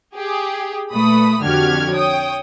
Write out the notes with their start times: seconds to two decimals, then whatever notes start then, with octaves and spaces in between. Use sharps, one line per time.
0.15 G4 G#4
0.91 A#2 A3 B4 B5 D#6
1.43 F2 D3 F#4 G4 F6 G#6
1.93 C#5 G5 D#6